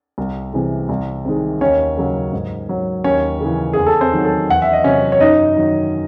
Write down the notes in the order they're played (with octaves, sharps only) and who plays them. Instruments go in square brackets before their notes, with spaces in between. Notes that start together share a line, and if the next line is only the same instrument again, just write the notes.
[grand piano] C2
C3 E3 G#3
C2
C3 D#3 G#3
D#2 C#4 C#5
C#3 F#3
G#2
F#3
D#2 C#4 C#5
C#3 E3
E2 G#4
A4
C4 C5
D#3 F#3
A4
E2 F#5
E5
D#5
C3 F#3 C#4 C#5
C#5
F#2 D#4 D#5
D#3 F#3